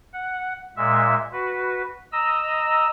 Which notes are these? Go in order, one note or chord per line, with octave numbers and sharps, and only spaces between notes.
F#5
A#2 G#3 E5
F#4 B4
D#5 A#5 E6